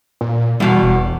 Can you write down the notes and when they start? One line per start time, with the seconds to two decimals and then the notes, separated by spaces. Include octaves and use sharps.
0.21 A#2
0.60 E2 B2 G3
0.83 E1